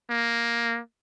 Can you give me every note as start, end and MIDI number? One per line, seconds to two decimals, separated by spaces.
0.10 0.79 58